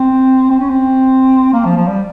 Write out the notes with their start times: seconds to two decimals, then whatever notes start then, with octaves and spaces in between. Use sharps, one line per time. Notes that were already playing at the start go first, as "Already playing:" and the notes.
Already playing: C4
0.50 C4
0.60 C#4
0.69 C4
1.53 A#3
1.65 F3
1.76 F3
1.87 G3